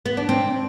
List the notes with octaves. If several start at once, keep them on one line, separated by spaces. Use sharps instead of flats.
B3
D4
C4